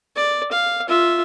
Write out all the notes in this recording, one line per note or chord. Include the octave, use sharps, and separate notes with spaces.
D5
F5
F4 E5